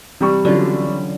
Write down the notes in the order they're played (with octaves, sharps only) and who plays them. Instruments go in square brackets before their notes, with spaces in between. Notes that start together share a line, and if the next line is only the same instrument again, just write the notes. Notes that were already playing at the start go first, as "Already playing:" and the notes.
[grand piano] C3 G3 C#6 [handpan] E3
[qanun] D3 F4 [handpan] F#3 C#4 D5